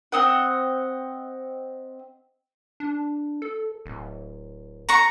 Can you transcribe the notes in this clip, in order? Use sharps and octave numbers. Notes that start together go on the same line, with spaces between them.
C4 D#5 F#5
D4
A4
D1
A#5 C#6